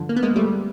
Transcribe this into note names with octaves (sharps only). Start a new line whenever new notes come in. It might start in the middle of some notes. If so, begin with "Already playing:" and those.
Already playing: G2 D3 F3
A#3
B3
G#3 A#3
G3 A3